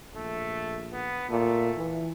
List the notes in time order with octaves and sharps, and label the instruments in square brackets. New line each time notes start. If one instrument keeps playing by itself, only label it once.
[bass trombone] A#1 [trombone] A3
[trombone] B3
[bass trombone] A#2 [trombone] A3
[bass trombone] E3